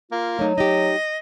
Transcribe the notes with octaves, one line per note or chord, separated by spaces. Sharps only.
A#3 F4
F#3 A3 D#4
D#4 G4 D#5